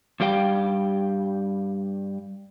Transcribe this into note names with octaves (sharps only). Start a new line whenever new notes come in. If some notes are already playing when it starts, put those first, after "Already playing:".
G2 G3 G4 F5 G5